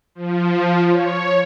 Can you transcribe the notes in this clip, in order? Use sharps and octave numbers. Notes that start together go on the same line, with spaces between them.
F3
C#5